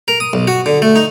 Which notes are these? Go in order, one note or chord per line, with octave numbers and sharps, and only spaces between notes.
A#4
D#6
B1
F#4
D3
A3
D#4